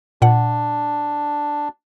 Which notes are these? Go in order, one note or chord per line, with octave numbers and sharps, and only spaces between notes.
A#2 D4 F#5